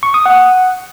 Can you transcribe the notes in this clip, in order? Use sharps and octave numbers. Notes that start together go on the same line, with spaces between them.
C#6
D#6
F#5